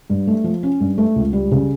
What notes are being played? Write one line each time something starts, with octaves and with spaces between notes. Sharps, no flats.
G2
A3
F3
C#4
G2
A3
C#2
G3
C#3